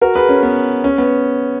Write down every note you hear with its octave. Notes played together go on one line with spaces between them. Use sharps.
F#4 A#4
G#4 B4
C#4
B3
C#4
B3